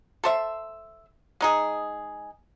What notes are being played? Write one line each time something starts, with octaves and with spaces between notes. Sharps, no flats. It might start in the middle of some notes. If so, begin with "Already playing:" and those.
A4 C5 E5
G#3 D#4 G#4